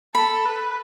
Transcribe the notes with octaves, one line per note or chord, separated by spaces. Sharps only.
A4 B5
B4